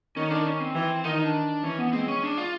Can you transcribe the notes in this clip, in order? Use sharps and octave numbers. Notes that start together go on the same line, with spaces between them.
D#3 C#4
D4
C#4
C4
E3
D#3 D#4
D#4
D4
E3 C#4
B3
G#3 C4
C#4
D4
F4